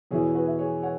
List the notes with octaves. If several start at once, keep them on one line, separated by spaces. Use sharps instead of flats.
E2 B2 B3 E4 G#4 C#5
F#4 B4
E5
G#4 C#5
C#5 F#5